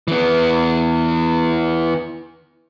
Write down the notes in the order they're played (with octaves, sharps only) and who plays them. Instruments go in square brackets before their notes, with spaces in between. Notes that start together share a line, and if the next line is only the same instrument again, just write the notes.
[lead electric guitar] E3 B3